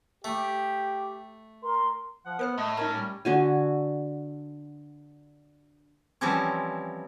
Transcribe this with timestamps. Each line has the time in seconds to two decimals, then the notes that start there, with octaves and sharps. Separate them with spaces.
0.24 A3 G4
1.63 A#4 C6
2.26 F3 F#5
2.39 B3 A#4 C5 F6
2.58 A2 A3 D#5
2.77 C#4 D#4 A#4 D#5 A5
2.93 G3
3.25 D3 F#4 G#5
6.21 E3 F3 G3 C4 C#4 E4